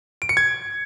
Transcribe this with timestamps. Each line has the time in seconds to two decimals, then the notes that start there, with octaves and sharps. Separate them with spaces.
0.22 D7
0.29 C#7
0.37 G#6